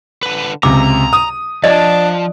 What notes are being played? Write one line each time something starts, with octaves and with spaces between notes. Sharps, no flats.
D3 B4
C#2 C3 A#5 D6
D#6
F3 D4 D5 D#5